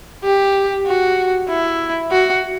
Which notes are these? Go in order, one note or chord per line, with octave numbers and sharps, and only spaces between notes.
G4
F#4
E4
F#4